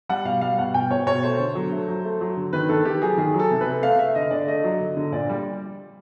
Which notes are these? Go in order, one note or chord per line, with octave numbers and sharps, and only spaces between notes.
G3 F#5
B2 F5
G3 F5
B2 F#5
B2 G5
B2 C#5
B2 C#5
A3 C5
D3
F#3
A3
F#3
A3
F#3
D3
D#3 B4
D#3 A4
D#3 G4
F#3 G#4
D#3 G#4
F#3
A4
C3
B4
C3
A3 F5
A3 E5
D3 D#5
D3 D5
A3 D#5
F#3
D3
D3
A#2 D5
G3